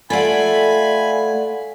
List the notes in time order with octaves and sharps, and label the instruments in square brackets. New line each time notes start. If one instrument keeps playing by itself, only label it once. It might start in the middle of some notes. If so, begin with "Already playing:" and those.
[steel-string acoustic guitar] A3 F4 [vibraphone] A4 D5 F#5 [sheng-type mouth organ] G#5 B5